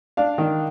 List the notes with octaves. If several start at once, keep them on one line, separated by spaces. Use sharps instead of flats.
D4 F5
D#3